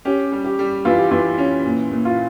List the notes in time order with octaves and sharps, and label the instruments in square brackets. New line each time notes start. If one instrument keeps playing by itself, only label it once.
[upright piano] C#4 [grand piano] G4
[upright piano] G3
[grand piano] G4
[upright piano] G3
[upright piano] E3 [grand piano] F4
[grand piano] G4
[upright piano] E3 [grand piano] F4
[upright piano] C#4
A#2
A#2
[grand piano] F4